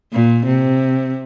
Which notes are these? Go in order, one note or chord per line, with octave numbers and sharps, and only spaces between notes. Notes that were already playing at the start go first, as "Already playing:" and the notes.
A#2
C3